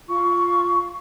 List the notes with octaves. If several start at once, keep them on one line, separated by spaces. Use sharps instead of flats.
F4 C#6